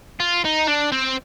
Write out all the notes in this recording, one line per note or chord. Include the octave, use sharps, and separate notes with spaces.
F4
D#4
D4
C4